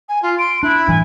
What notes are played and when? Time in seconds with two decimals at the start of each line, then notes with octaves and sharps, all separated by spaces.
0.09 G#5
0.22 F4
0.39 C6 D7
0.63 D4 E4 F#6
0.88 A1 G2 E3 G#5